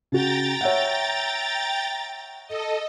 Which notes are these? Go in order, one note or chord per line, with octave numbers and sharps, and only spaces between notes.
C#3 F#4 G5 A#5 A6
C#5 E5 F#5
A4 D#5